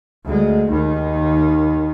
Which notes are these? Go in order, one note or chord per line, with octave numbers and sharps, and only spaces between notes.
D2 G#3
D#2 D#3